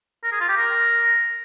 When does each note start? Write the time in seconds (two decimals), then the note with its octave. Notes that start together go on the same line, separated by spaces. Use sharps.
0.24 A#4
0.32 G#4
0.40 F4
0.49 G4
0.57 A#4